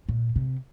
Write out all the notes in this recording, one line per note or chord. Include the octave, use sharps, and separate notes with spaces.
A#2
C3